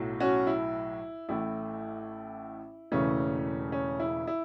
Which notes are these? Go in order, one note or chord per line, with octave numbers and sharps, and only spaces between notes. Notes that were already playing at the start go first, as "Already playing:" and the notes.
Already playing: B1 A2 F#3 A3
C#4 F#4
E4
A1 A2 A3 E4
E1 E2 C#3 E3 A3 C#4
C#4
E4
E4